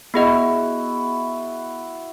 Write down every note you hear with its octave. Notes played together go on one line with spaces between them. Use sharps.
B3 E4 F#4 G#4 D#5